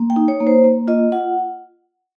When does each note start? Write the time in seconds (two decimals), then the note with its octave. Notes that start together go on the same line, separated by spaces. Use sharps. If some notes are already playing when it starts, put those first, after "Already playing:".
Already playing: A#3
0.10 G5
0.16 D#4
0.28 C#5
0.40 A#3
0.47 C5
0.64 A#3
0.88 F4 D#5
1.12 F4 F#5